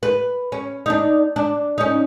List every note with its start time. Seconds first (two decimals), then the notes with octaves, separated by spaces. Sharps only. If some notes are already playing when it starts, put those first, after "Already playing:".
0.03 B4
0.52 C#4
0.86 D4 D#4
1.36 D4
1.78 C#4 D#4